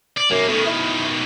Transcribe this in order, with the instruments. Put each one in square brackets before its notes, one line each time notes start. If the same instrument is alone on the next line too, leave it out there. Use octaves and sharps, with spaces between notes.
[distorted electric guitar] D5
[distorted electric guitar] B1 A#3 [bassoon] F#2
[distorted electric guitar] B2 D#3 [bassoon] A3
[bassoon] E4